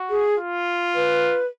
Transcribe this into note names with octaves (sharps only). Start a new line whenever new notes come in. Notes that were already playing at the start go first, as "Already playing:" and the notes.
Already playing: F#4
G#4
F4
B4